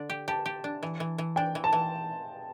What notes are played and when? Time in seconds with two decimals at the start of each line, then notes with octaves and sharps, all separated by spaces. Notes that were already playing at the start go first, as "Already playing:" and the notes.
Already playing: D3 D4
0.10 G4
0.28 G4 A5
0.46 G4
0.64 D4
0.83 E3
1.00 E3
1.18 E3
1.36 D4 G5
1.55 E3
1.64 A5
1.73 E3